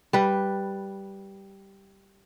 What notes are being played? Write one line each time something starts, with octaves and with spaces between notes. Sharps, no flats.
G3 B4